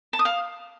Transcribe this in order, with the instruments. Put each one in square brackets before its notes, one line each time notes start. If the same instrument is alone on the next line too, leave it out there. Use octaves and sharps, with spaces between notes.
[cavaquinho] A5
D#6
F5